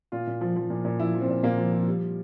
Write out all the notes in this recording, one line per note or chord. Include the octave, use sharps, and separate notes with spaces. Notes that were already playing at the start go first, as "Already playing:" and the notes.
A#2 F4
A#2
F3
F3
A#2
A#2
F3 E4
F3
C4
A#2
A#2 A#3
F3
F3
G3